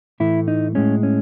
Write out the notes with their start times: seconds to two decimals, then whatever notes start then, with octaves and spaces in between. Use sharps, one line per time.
0.20 A2 E3 A3 E4
0.48 D#4
0.75 A2 G#3 C#4
1.03 C#4